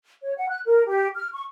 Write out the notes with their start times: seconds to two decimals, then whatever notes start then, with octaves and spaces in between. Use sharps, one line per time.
0.22 C#5
0.37 F#5
0.49 F#6
0.65 A#4
0.88 G4
1.16 F6
1.33 C#6